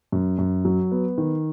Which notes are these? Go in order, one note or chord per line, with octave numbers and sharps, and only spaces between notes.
F#2
F#2
F#3
B3
D#3